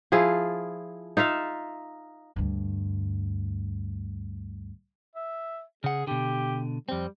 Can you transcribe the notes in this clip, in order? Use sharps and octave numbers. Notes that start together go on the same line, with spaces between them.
F3 E4 F4 G#4
D#4 F4 E5 F5
D2 G2
E5
C#3 G#4 F#5
B2 D3 G4
F2 G3 C4